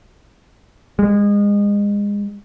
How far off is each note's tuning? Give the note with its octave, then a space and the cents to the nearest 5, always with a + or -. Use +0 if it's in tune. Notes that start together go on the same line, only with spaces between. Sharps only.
G#3 -25